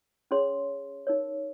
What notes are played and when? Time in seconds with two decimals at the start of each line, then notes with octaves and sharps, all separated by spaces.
0.31 C#4 G#4 C#5 C6
1.07 D#4 A#4 C#5